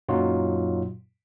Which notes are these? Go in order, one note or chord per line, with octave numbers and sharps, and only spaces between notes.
F#2 A#2 F#3 D#4 F4 F#4